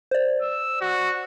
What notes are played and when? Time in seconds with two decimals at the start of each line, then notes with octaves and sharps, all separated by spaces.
0.11 C5 D5
0.41 E6
0.81 F#4